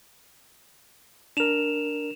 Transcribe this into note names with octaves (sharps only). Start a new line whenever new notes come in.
D4 A#4 E7 F7